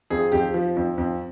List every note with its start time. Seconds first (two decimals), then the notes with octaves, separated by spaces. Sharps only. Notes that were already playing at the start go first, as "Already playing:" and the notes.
0.10 F2 G#4
0.32 F2 G4
0.54 F3
0.77 F2
0.98 F2